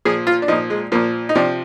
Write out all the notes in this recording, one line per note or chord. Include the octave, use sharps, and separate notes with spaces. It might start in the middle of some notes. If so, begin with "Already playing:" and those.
A#2 F3 G#4
F4
D4
A#2 F3 D#4
G#3
A#2 F3 A#3
D#4
C3 F3 D4